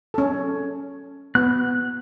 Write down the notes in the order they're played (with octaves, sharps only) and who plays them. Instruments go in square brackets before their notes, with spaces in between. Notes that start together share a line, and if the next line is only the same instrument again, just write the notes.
[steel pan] C#4 A4
[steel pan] B3 [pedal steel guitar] F#6